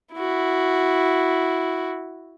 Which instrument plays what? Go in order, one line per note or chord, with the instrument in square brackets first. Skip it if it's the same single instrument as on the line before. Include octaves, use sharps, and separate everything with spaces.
[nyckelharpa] E4 F#4